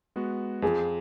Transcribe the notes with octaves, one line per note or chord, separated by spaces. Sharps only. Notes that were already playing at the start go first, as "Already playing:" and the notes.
G#3 B3 F#4
F2 F4 G#4